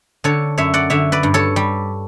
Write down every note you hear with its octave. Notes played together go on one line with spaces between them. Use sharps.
D3 A4 C#5
F#2 C#5 E5
D5 F#5
D3 C#5 E5
B4 D5
G2
A4 C#5
G3